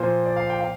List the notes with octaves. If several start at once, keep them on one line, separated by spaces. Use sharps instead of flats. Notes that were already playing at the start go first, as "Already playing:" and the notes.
Already playing: A#2 F3 C5
D5
F5
G5
F5